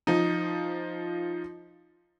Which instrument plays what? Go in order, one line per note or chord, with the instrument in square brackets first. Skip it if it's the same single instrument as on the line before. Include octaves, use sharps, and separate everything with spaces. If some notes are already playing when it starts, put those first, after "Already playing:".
[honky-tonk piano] F3 D#4